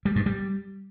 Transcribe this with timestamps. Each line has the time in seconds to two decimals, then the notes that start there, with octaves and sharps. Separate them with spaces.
0.05 G3
0.16 G2
0.26 G3